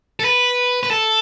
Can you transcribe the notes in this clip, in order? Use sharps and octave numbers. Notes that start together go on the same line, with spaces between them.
A4
B4
B4
A4